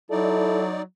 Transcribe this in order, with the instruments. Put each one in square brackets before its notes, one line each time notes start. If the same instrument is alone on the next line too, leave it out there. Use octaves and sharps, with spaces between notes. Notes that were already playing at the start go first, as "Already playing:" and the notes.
[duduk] F#3 [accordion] D#4 D5 [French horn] E4 [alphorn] A4